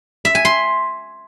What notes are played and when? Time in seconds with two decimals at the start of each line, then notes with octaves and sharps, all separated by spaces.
0.25 E5
0.35 G#5
0.45 C6